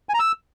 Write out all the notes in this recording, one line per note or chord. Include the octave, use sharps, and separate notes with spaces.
G#5
A#5
E6